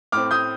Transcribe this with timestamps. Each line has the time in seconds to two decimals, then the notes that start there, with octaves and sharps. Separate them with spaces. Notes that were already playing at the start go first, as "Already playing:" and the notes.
0.12 A2 A3 C4 D6 F6
0.31 D#6 G6